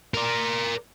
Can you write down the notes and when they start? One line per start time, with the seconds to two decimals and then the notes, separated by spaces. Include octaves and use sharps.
0.14 A#4 D5